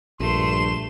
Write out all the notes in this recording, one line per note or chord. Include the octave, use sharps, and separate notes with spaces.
A#1 G2 A3 C6 E7